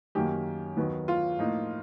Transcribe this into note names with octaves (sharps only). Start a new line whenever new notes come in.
F#2 D#3 F#3 A#3 G4
D#2 D#3 F#3 B3
F4
A2 F3 A#3 D#4